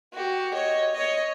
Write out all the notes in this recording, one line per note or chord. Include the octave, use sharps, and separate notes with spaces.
F#4 G4
C#5 D#5
C#5 D#5